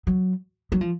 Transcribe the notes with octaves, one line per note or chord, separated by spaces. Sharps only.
F#3
F#3
F3